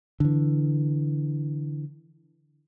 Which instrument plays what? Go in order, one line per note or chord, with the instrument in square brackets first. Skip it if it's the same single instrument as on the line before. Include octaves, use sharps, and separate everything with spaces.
[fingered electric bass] D3 E3